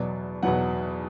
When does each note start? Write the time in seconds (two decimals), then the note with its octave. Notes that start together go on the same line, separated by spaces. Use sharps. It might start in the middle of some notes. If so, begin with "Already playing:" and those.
Already playing: E2 B2 F#3 D5
0.43 E2 B2 F#3 F#5